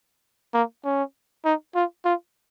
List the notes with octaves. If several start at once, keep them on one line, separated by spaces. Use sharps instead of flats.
A#3
C#4
D#4
F4
F4